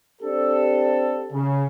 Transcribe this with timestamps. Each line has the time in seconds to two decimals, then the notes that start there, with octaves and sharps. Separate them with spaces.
0.22 C4 D4 G4 A4
1.32 C#3